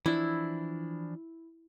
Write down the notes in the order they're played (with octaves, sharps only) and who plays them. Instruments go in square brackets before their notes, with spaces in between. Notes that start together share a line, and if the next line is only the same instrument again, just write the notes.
[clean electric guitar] E3 F3 D4 [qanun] E4